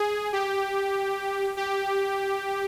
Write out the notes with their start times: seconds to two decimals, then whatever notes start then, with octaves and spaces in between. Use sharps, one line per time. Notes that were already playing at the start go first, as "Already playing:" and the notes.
Already playing: G#4
0.33 G4
1.57 G4